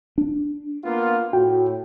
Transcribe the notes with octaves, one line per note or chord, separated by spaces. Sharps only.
D4
A#3 B3 F4
A2 F#4 G5